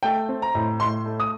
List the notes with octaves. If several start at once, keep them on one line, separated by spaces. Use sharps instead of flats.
A3 G5
C4
A#5
A2
A2 C6
A3
D#6